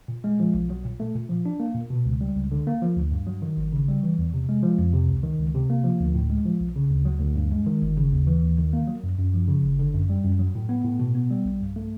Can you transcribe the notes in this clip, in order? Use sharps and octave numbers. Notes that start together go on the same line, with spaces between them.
A#2
G#3
F3
B1
F#3
A#2
A3
A#2
F3
D4
A#3
A#2
B2
C#2
G3
C#2
D3
A#3
F3
D2
G2
F#3
D#3
G#1
C#3
G3
E3
E2
C3
G#3
F3
F2
C3
C#2
D#3
C#2
C3
A#3
F3
D2
A2
G#3
F3
B1
C#3
D2
F#3
D2
G2
G#3
D#3
G1
C#3
D#2
E3
D#2
D#3
A#3
F#3
F#2
F#2
F3
C#3
G1
D3
F#2
G3
F#2
F#3
A2
B3
A2
B2
B3
G3
B1
G2
A3